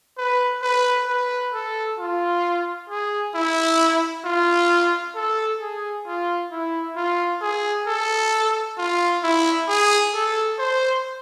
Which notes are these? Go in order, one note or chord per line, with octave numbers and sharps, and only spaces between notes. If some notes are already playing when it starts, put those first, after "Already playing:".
B4
B4
B4
A4
F4
G#4
E4
F4
A4
G#4
F4
E4
F4
G#4
A4
F4
E4
G#4
A4
C5